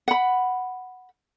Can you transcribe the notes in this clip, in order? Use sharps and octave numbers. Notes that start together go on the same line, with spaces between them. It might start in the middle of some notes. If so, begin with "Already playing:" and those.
F#5 B5